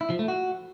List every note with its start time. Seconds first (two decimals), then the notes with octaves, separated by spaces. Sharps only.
0.01 E4
0.10 F3
0.19 A3
0.28 F#4